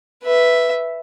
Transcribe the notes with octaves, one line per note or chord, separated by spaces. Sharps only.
B4 E5